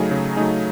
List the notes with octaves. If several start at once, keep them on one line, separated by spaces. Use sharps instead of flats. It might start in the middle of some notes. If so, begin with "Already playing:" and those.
Already playing: C#3 F#3 A3 D#4 G#4
C#3
F#3 A3 D#4 G#4